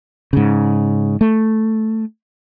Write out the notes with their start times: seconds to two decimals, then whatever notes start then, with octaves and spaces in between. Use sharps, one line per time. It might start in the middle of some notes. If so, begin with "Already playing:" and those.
0.33 G#2 C#3
1.21 A3